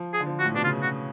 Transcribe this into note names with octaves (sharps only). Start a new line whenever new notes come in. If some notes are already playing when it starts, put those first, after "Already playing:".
Already playing: F3
G#4
D3
F3
F#4
A2
B2 D4
C#3 F4
F#4